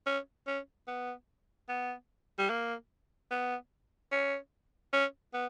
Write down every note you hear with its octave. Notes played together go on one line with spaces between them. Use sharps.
C#4
C#4
B3
B3
G3
A#3
B3
C#4
C#4
B3